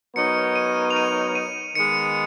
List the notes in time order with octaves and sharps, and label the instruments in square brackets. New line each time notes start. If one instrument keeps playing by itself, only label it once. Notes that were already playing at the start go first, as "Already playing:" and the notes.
[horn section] F#3 B3 D#4 A#4 C#5 [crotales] C#7
[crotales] D#7
F7
D#7
D#7
[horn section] D#3 G#3 B3 [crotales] C#7